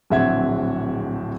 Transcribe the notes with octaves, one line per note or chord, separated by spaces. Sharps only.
D1 A#1 C4 E5 F#5 G#6